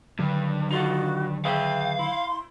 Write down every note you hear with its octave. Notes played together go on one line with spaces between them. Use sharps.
G2 D3 D#3 F#3
D#4 F4 F#4 A4
G#4 B4 E5 F5 G5
E4 C6